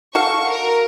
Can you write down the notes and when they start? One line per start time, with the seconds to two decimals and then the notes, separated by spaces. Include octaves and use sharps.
0.15 F#4 A4 F5 C#6
0.49 A#4